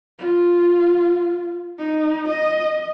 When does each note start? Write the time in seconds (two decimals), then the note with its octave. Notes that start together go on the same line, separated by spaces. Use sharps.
0.19 F4
1.79 D#4
2.28 D#5